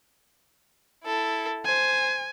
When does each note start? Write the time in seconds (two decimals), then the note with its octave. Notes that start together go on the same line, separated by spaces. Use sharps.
1.05 E4 A4
1.65 C5 G#5